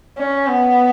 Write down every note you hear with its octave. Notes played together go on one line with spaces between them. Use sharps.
C#4
B3